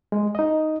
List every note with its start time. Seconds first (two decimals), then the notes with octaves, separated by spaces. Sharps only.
0.12 G#3
0.35 D#4 D#5